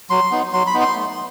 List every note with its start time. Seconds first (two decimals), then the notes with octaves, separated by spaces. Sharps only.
0.10 F#3 C6
0.31 B3 D#4
0.53 F#3 C6
0.67 B5
0.74 B3 D#4
0.81 C6
0.95 A3